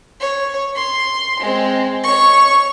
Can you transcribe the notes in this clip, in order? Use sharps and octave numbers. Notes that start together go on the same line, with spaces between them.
C#5
C6
G#3 C4
C#5 C#6